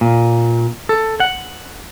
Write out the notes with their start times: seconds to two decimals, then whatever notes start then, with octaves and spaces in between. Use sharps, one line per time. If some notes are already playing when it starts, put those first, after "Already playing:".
0.01 A#2
0.89 A4
1.20 F#5